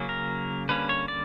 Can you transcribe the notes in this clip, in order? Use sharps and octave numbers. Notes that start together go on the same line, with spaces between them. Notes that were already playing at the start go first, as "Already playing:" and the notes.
Already playing: C#3 F#3 A#3 C#4
A#4
D3 G3 A#3 C#4 B4
C#5
D5